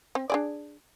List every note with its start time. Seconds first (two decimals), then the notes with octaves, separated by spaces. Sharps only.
0.15 C4
0.30 D4 G#4 D5